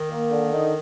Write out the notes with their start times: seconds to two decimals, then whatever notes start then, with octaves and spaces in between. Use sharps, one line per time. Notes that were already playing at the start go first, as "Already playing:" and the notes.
Already playing: D#3
0.08 A#3
0.31 D3
0.52 D#4